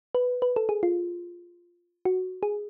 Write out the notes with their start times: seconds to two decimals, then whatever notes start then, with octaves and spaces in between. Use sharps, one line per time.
0.15 B4
0.42 B4
0.56 A4
0.69 G#4
0.83 F4
2.05 F#4
2.43 G#4